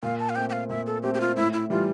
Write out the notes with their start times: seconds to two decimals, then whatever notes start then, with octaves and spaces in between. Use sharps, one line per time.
0.03 A#2 F5
0.19 A5
0.29 F5
0.36 A3 C4 G5
0.49 G5
0.52 F5
0.69 A#2 E5
0.87 A4
1.03 A3 C4 G4
1.14 G4
1.21 F4
1.36 A2 E4
1.53 E4
1.70 E3 G3 F4